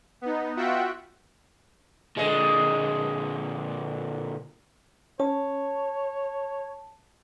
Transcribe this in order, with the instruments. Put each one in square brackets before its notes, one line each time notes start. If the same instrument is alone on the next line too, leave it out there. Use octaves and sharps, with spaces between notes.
[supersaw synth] B3 D#4
F4 F#4 E5 F#5 G5
[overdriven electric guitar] A#2 D3 [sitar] G#3 D#5
[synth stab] C#4 [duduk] C#5 [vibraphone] A5